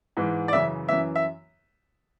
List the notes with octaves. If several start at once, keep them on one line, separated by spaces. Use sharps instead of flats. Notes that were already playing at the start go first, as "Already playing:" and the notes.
G#2 E3
D5
F#2 C#3 E3 E5
F#2 E3 E5
E5